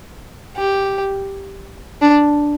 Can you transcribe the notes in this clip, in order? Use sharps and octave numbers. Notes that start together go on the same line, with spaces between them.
G4
D4